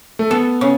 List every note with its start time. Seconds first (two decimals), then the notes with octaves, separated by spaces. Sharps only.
0.19 A3
0.30 B3 A4
0.61 C#3